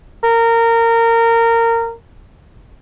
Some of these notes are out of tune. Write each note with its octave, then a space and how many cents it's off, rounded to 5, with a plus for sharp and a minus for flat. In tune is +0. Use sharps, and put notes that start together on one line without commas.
A#4 -20